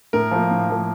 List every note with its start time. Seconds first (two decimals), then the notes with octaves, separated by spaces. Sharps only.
0.13 A2 A#4
0.31 F3 A#3
0.51 A2
0.70 F3 A#3